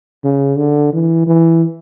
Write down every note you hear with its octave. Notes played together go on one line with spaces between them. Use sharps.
C#3
D3
E3
E3